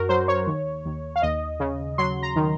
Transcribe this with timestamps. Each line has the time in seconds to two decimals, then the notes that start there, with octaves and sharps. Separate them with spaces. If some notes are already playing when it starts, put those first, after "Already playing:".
Already playing: F#2 F#4 A#4
0.09 F#3 C5
0.28 C#5
0.47 D#2
0.85 D#2
1.16 F5
1.22 D#2 D#5
1.60 C#3
1.98 F#3 C6
2.23 A#5
2.36 D#3